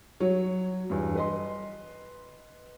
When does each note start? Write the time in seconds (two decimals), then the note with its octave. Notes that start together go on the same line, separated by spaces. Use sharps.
0.20 F#3 C#5
0.90 E2 G2
1.15 B4 D#5 C6